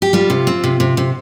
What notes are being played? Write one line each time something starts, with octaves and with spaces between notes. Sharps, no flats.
G4
G3 F4
C3
C4
C3
C3
C3